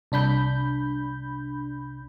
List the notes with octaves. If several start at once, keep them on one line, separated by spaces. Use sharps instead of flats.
C2 D4 B5 G6